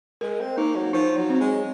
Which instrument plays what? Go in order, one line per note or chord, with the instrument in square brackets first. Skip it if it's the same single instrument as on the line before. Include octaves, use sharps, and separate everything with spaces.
[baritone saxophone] G#3 [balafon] A#4
[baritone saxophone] C4
[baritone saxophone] A#3 [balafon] D#4
[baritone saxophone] F#3
[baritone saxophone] F3 [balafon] D#4
[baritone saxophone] F#3
[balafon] C4
[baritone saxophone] G#3